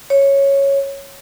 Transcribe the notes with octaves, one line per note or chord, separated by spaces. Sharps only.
C#5